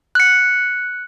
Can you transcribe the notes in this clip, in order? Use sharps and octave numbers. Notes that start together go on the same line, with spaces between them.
F#6 C#7